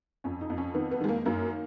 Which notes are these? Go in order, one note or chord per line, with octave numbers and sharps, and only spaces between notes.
F2 C#4
D#4
F2
C#4
D#3 B3
B3
D#3 G#3
A#3
F#2 A#3